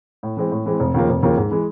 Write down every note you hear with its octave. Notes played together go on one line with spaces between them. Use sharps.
A2
E3 G#3 C4
A2
E3 G#3 C4
F1
D#2 C#3 F3 A#3
F1
D#2 C#3 F3 A#3
G#2
E3 G#3